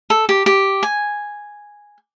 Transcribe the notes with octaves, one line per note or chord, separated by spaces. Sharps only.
A4
G4
G4
G#5